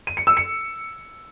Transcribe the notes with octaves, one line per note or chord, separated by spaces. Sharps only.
D#7
C#7
E6
C#7